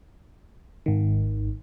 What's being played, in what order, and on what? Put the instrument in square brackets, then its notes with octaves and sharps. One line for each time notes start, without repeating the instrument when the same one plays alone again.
[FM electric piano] G#1 D#3